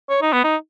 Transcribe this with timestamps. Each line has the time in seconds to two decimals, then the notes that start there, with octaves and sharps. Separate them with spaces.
0.09 C#5
0.22 D#4
0.33 B3
0.44 D#4